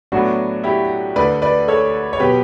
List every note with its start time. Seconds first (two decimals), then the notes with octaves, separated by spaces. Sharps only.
0.12 A2 F#3 B3 D4 F#4
0.64 E4 G4
1.16 D2 D3 A3 B4 D5
1.42 B4 D5
1.68 A4 C#5
2.13 C#5
2.19 B2 F#3 G4 B4